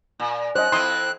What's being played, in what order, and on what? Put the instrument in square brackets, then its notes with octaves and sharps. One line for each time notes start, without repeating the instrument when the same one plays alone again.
[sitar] A#2
[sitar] F#2 [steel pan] C5 D#5 [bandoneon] F#6
[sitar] F2 C4 E4 [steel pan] C6 D#6